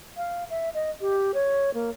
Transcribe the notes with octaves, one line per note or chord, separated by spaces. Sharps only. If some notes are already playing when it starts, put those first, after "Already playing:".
F5
E5
D#5
G4
C#5
A#3